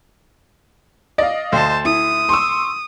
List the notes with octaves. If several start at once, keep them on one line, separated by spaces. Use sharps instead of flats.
D5 D#5 F5
D2 C5 A5
E4 D#6
C6 C#6 E6